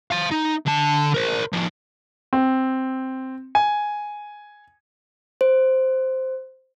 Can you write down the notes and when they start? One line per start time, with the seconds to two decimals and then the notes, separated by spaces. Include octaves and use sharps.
0.11 F5 A5
0.31 D#4
0.66 D3 A5
1.14 A#4 C5
1.52 F3 G#4
2.33 C4
3.55 G#5
5.41 C5